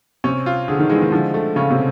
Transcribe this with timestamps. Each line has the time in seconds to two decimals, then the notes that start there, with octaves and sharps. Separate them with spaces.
0.24 C3 C#4
0.46 F4
0.68 D3 G#4
0.79 D#3
0.89 E3 G#3
1.01 D#3
1.12 D3 F3
1.34 A3
1.56 C#3 C#4
1.71 C3